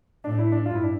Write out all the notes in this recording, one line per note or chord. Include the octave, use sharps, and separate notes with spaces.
A2 D4
E4
D4
G2 F4
E4
D4